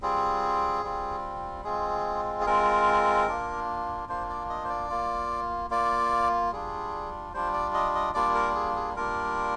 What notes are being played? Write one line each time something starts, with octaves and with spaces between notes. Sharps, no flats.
G3 C4 F4 G#4
G3 C4 F4
G#3 C4 F4 G#4
G#4
G#3 C4 F4 A#4
A#3 D4 F4
A#3 D4 F4 C5
D5
D#5
C5
D5
A#3 F4
A#3 F4 D5
G3 D4 F4 G#4
G3 D4 F4 C5
D5
D#5
D#5
G3 A#3 D4 F4 D5
A#4
G#4
G#4
G3 A#3 D4 F4 A#4